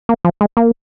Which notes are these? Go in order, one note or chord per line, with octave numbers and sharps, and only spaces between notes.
A#3
F3
G#3
A#3